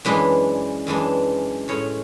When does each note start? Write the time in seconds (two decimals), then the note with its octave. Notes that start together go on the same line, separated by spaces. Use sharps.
0.05 F#2 E3 G#3 D4 B4
0.87 F#2 E3 G#3 D4
1.68 A2 G#3 C#4 C#5